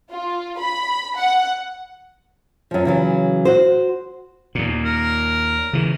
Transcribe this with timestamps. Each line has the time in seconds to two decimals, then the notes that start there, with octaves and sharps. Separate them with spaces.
0.10 F4
0.60 B5
1.16 F#5
2.71 F#2 F3
2.85 C#3 E3 F#3
3.45 F#4 C5
4.55 D#2 A#2
4.84 A#4
5.73 C#3 E3